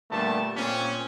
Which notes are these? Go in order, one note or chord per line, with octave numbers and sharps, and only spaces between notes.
A#2 D3 G3 A3 B3 A5
A#2 C4 C#4